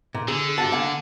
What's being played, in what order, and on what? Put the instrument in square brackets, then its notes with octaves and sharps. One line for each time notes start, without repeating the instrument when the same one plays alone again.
[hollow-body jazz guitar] A#2
[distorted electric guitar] D3 [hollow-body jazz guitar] G#4
[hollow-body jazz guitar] G2 F#4 A5
A#3 F#5 G#5